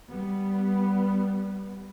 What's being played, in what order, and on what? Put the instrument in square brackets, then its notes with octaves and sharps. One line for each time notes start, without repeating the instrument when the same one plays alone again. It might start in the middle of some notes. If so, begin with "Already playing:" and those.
[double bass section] G3 B3